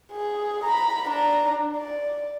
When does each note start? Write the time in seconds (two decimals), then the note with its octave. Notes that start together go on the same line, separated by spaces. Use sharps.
0.12 G#4
0.64 A#5 B5
1.09 D4 A#5
1.77 D5